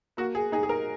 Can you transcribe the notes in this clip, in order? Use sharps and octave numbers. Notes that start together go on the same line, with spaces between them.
A#3 F#4
G#4
D#4 G#4
G#4
A#4